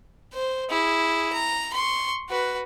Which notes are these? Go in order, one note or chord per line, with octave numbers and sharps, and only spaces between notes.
C5
E4 G#4
A#5
C6 C#6
F#4 B4